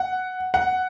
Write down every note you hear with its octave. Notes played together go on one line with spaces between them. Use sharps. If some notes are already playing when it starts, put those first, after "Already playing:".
Already playing: F#5
F#5